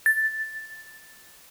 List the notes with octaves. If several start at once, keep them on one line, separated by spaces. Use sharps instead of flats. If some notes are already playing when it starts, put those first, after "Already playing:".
A6